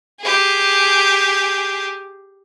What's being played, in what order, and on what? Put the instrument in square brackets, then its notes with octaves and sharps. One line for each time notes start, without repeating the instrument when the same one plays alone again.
[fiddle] G4 G#4